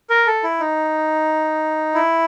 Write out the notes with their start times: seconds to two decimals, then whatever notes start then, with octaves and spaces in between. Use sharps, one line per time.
0.10 A#4
0.27 A4
0.44 E4
0.60 D#4
1.94 E4